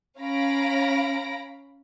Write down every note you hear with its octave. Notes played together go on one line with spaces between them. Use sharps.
C#4 F5 A#5 B5 A#6 D7